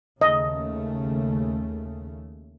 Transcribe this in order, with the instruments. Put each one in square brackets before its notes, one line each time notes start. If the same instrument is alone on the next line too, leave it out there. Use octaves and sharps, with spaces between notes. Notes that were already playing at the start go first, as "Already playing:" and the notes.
[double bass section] D#2 C#3 A3 [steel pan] D#5